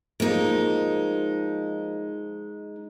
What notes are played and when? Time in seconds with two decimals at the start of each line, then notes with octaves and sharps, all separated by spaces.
0.20 F3 G#3 A#3 D#4 F4